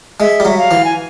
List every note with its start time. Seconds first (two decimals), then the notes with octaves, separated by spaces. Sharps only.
0.20 G#3 E5
0.40 G3
0.45 F#3 E5
0.58 F5
0.71 E3
0.85 G#5